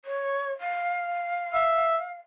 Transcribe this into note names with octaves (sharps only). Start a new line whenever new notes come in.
C#5
F5
E5